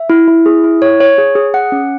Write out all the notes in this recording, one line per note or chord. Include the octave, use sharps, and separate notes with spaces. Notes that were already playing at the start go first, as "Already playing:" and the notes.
Already playing: E5
E4
E4
G#4
E4
C#5
C#5
G#4
G#4
F#5
C#4